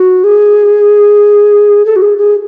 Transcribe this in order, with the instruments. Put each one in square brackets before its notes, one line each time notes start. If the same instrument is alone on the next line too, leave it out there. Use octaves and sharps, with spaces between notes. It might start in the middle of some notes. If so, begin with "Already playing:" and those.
Already playing: [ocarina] F#4
G#4
A4
F#4
G#4
G#4